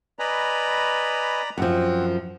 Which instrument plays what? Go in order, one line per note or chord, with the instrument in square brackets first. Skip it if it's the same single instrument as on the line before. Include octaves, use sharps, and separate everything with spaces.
[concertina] B4 D#5 G#5 [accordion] D5 A#5 B5
[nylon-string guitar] F#2 F3 [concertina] C4 F#5